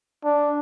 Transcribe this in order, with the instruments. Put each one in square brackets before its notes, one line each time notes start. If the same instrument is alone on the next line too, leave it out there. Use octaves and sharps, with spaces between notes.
[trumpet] D4